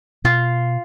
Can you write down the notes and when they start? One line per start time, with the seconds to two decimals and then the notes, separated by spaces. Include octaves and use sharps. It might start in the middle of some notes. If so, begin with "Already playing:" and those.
0.24 B2 F4